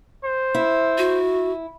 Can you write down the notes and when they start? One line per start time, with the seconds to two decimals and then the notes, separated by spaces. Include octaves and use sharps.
0.25 C5
0.55 E4
0.98 F#4